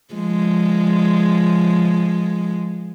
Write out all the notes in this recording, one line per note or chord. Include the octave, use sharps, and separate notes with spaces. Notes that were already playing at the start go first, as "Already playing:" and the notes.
F3 G#3